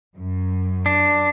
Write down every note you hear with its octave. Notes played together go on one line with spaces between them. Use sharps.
F#2
D4